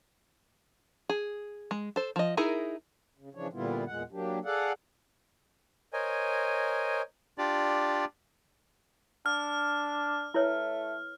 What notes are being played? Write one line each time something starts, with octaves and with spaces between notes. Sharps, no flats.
G#4
G#3
A4 C5
F3 D#5
D#4 E4 G#4 A#4
C#3
C#3 E3 F3 D4 C#5
A#2 D3 G3 B3 E4 F4
E2 A#2 G#3 F#5
F#3 A#3 D4 G4
G#4 A4 D5 F5 F#5
A#4 C5 C#5 D#5 G#5
D4 F4 G4 D5
D4 F6
A3 E4 B4 C#5